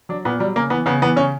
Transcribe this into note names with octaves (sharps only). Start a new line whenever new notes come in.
F#3 D4
A#2 B3
F#3 G3
C#3 A#3
E3 B3
C#3 B3
E3 B3
C#3 C#4